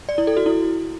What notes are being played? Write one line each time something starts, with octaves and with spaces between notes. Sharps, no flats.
D5
E4
A4
F#4
E4